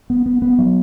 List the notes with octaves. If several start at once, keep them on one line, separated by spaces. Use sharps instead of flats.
B3
B3
B3
F#3